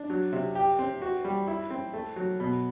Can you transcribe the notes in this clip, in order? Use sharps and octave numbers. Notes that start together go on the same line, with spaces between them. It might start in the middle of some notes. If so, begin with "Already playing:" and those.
Already playing: D4
F#3
C3
G4
C4
F#4
G3
E4
C4
A3
F#3
B2